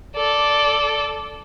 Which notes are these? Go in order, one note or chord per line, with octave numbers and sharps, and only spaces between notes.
A4 D5